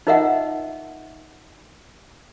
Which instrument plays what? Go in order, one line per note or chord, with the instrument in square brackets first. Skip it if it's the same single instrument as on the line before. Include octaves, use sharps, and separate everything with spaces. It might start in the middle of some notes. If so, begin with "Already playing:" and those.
[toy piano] D#4 F4 A#4 D#5 E5 F#5